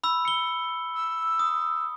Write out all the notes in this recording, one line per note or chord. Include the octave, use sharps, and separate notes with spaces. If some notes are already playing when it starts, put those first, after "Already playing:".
B5 E6
C#7 G7
E6
D#6